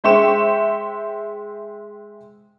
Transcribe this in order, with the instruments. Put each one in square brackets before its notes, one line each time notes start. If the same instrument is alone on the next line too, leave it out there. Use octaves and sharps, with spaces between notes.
[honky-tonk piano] G#3 C5 E5 G5 C#6 E7